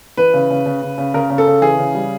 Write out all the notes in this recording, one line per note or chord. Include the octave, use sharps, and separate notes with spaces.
E3 B4
C#3
C#3
C#3
C#3
C#3
C#3 A#4
C#3
A4
C#3
E3 G#4
C#3
G3